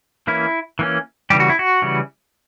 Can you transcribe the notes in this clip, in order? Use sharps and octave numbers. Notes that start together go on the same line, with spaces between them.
E3 A#3 C#4 E4
E3 A#3 C#4
C#3 E3 G3 G4
F#4
E4
F#4
C#3 E3 G3